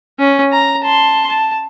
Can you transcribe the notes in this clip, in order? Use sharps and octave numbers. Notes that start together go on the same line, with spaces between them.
C#4
A#5
A5 C6
A5